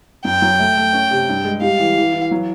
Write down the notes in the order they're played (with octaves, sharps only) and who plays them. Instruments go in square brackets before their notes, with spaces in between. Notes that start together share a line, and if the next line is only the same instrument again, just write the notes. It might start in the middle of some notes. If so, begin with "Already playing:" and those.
[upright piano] F#2 [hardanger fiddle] G5
[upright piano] F#3
A3
A3
C#4
C3
G2
G#3
[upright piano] G3 [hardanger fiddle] F5
[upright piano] E3
E3
E3
F#3